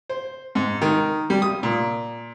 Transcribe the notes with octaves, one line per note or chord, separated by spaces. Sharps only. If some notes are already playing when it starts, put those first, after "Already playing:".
C5
G#2
D#3
G3
D#6
A#2